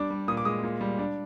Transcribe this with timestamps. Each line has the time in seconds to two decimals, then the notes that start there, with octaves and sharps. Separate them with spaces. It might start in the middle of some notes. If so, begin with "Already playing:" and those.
Already playing: G3 D4 D6
0.10 G3
0.28 A#2 D#6
0.37 D6
0.45 G#3 D#6
0.63 A#2
0.81 G3
0.99 D4